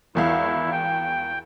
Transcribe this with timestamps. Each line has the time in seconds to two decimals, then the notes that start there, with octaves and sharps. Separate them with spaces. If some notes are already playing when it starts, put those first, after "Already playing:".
0.15 G#1 E2 E4 F5
0.72 G5